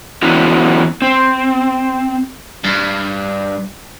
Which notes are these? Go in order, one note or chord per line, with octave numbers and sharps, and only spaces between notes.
E3 F#3 B3 C#4 E4 F#4
C4
G2